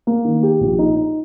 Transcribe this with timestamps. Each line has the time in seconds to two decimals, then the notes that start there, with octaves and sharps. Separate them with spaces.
0.07 A#3
0.24 D#3
0.43 G4
0.61 A#1
0.79 D#4
0.97 D#4